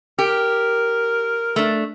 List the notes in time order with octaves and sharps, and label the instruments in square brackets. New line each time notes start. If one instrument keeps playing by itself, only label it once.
[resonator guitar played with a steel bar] G4 [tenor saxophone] A#4
[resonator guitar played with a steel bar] A3 D4